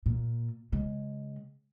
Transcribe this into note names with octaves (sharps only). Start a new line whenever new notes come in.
A#2
C#3 G#3